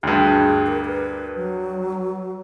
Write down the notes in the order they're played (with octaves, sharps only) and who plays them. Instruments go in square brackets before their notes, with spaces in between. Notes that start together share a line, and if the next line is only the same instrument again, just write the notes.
[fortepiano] D2 G2 [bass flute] G#4
[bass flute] A#4
B4
F#3